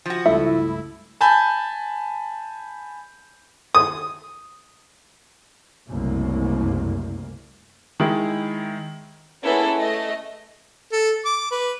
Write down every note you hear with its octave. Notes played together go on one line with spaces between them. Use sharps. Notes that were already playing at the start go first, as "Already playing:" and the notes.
F3 F#4
C#2 G2 A3 E4 E5
G#5 A5 B5 G6
D#6
F#1 C2 F#2 A3 A#3
D#3 G#3 E4
A#3 B3 C#4 E4 G#4 A4
A3 D#5
A4
D6
B4